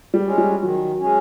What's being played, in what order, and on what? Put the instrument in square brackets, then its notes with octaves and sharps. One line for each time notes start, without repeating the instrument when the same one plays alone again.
[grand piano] G3
[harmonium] G#3 C#4
[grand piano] G3
[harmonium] D#3 [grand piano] F#3
[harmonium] G#3 C#4